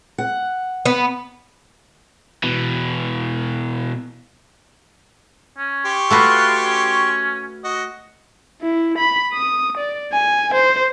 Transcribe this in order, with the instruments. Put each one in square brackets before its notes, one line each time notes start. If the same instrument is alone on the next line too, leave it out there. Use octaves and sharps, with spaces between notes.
[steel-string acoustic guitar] F#5
[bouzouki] B3
[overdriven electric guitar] B2 E3
[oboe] C#4
[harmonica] G4 C6 C#6
[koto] A3 F#4 B4 [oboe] F4
[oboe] C#4
[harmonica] F#4 D#5
[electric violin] E4
B5
D#6
D5
G#5
C5